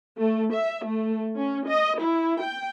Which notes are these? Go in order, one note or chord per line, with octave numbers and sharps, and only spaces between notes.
A3
E5
A3
C#4
D#5
E4
G5